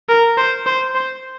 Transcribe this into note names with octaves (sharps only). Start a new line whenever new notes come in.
A#4
C5
C5
C5